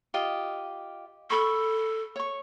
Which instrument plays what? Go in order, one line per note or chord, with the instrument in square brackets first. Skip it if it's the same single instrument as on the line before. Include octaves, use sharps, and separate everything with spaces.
[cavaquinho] F4 G4 D#5
[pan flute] A4 [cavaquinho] B5 C#6
[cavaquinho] C#5 C#6